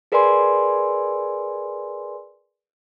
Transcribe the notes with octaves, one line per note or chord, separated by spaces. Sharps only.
G#4 A#4 B4 D5 G#5 C6